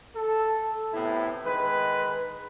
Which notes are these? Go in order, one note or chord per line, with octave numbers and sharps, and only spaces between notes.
A4
A2 C3 B3 E4
D#3 G#3 B4